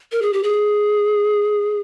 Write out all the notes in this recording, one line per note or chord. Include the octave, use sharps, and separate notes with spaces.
A#4
G#4
G4
G#4